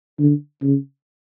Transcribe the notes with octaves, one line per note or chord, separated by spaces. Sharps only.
D3
C#3